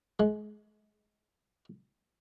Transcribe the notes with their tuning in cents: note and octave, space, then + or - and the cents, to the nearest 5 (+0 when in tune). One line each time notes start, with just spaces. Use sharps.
G#3 +30